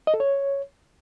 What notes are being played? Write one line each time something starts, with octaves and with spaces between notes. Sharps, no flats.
D#5
A4
C#5